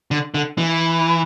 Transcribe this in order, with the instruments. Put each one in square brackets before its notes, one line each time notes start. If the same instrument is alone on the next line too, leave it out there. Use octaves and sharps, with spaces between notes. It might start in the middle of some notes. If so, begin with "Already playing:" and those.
[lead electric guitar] D3
D3
E3